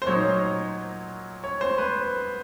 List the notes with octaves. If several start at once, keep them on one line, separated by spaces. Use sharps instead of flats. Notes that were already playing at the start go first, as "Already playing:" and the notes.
C5
A#2 F#3 A#3 D#4 C#5
C#5
C5
B4